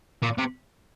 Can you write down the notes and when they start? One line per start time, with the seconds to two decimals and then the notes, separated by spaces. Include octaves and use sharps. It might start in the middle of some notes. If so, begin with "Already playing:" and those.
0.23 A#2
0.38 C3